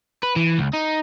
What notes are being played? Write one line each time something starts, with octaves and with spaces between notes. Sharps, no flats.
B4
E3
C#2
D#4